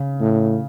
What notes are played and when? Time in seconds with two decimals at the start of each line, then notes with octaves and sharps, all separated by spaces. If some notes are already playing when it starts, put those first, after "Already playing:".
Already playing: C#3
0.20 A2